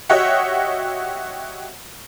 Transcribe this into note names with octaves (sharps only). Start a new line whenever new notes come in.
F#4 G4 C#5 D#5 E5 F#5